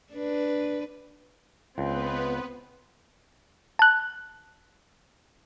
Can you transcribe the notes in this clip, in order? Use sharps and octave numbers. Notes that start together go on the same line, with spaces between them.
D4 B4
C#2 B3 C4 B4
A5 F#6